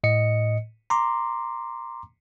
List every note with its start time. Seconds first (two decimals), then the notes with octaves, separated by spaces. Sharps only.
0.04 A2 D#5 C#7
0.90 A#5 C6 D6